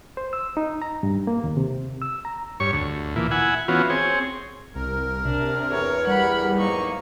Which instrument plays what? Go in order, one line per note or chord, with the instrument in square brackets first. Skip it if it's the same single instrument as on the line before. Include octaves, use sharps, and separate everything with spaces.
[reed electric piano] C5
E6
D#4
A#5
G2
A#3
D#2
C3
E6
A#5
[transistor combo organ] G2 C#5 C#6
D2
A#2 E3
E4 F#5 G#5
E3 B3 C#4 F4 F#4
C4 G#4 C#5
[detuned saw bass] C2 [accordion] A#4
[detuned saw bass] C3 [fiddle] D4
[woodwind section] E2 [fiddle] C#5
[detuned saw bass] G3 [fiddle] F#5 B5
[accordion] G#2 F#3 A#3 [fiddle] D#4 C#6